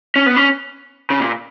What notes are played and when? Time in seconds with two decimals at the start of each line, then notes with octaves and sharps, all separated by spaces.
0.16 C#4
0.26 B3
0.36 C#4
1.10 C#3
1.20 A#2